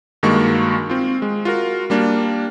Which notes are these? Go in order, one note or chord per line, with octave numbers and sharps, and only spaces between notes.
G2 D#3 G#3 A#3 F#4 C#6
C4 F4
G#3
F4 F#4 A#4
G3 A#3 D4